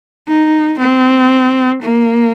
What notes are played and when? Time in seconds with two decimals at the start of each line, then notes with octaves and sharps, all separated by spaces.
0.28 D#4
0.80 C4
1.82 A#3